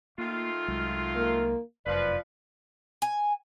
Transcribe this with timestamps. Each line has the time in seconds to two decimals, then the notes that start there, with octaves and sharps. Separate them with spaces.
0.18 D#3 A3 A#3 F4
0.68 C2 F#3 G#3
1.16 A#3
1.86 F1 F#2 F3 B4 D5
3.02 G#5